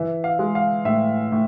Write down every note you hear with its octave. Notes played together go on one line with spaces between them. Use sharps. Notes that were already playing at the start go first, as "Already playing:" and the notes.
Already playing: E3 E5
F5
G#3
F5
A2 E5
A2